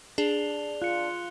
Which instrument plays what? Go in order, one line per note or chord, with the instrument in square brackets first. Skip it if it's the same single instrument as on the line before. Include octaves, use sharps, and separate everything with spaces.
[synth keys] D4 [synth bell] G#4 [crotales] F7 G7
[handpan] F4 [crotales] F#6 C#7